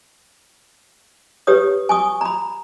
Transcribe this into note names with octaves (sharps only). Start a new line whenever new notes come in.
G4 B4 C#5 D#6
G#5 C#6 D#6
A#5 B5